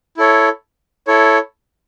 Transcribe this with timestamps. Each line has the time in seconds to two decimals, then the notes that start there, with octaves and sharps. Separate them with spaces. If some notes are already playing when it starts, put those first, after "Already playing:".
0.17 E4 A4 C#5
1.07 E4 A4 C#5